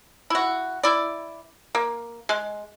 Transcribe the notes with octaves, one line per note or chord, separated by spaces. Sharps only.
E4 F#4
E4 D5
A#3
G#3